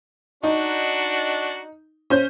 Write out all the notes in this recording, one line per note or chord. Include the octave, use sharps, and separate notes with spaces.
D4 D#4 F#4
C#4 C5 G6